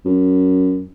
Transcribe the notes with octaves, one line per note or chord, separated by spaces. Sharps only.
F#2